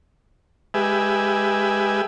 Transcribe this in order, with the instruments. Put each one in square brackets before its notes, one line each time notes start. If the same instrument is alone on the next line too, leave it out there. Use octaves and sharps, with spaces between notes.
[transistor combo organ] G#3 G4 B4 E5 G#5